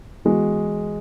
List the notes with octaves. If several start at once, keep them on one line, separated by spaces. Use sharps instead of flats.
E3 G#3 B3 F#4